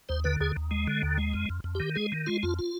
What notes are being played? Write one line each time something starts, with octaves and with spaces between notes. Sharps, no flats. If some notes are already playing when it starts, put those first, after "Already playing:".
D#2 C5
D3 B4
D#2 G#4
D#2
G#3
D3
D#2
G#3
F2
F2
F2
D#3 G4
G#3 G#4
D#3
G#3 F4
F2 F4
F4